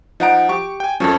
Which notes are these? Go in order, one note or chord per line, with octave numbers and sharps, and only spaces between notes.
F3 D#4 F#5 A#5 D7
G4 C#6
G5 G#5
F2 F3 C#4 A4